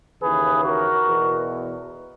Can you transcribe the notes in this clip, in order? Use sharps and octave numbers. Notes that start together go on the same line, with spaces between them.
D#2 C#3 E3 G#4 B4
F#4 A#4
E2 B2